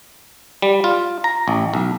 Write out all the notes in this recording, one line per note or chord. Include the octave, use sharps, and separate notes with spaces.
G3
F4
A#5
A1
B1